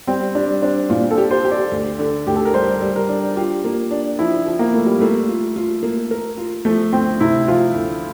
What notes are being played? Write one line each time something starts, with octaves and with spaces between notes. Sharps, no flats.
G3 C4
G3 D4
C4 D4
A#2 F4
A4
G4
C5
G4
D5
D2
D3
D2 G4
A4
A#4
G3 C5
G3
A#4
D4
F4 G4
A#3
D4
F3 E4
F3
A#3
A3 A#3
G3
A3 A#3
F4
F4
A#3
A#4
F4
F3 A3
D2 C4
C3 E4
F3 F4
D2